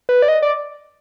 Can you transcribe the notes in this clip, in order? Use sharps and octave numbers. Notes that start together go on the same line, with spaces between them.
B4
D5
D#5
D5